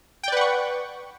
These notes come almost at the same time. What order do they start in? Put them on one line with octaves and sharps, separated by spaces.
G5 D5 B4 F#5 C#6